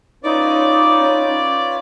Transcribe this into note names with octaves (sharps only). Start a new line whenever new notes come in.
C#4 D#4 F4 B4 C#5 D5 D6